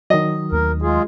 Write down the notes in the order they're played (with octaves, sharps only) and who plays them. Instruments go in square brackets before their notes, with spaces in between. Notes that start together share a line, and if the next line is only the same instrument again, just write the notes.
[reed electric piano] D#3 F#3 [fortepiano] D#5
[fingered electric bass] D#2 A3 [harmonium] A#4
[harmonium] G#3 F4 G#4